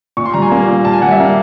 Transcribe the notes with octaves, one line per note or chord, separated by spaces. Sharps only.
A#2 C#6
C6
G3 A#5
G#5
A#3
A#2
A#2 A5
G#5
G3 F#5
E5
A#3